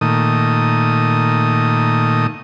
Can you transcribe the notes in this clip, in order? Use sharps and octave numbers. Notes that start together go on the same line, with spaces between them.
A#2 D#3 A3 D#6